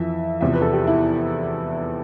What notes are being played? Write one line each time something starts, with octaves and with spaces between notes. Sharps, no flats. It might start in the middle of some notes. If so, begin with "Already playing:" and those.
Already playing: F2 E3 E5
E2 C3 F3 E5
B4
A4
G4
E4